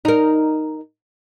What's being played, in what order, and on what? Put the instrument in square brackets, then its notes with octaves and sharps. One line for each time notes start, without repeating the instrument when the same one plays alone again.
[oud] D#4 A#4